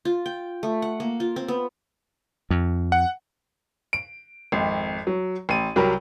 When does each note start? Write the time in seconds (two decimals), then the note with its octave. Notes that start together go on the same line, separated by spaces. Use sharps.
0.05 F4
0.26 G5
0.63 A3
0.82 F#5
1.00 A#3
1.20 F4
1.36 C4
1.48 B3
2.50 F2
2.92 F#5
3.93 D7
4.52 G#1 F2
5.07 F#3
5.49 A1 D#7
5.76 C2 F#3 G4 A#4 B5